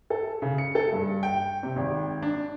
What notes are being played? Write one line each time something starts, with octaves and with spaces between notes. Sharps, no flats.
A4
C#3
C#7
A4
G2
G5
C3
G#1
D4